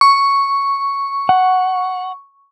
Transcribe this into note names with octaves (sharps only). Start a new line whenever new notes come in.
C#6
F#5